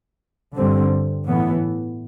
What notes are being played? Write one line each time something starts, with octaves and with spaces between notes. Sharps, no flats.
G2 D3 G3 C4
A2 E3 B3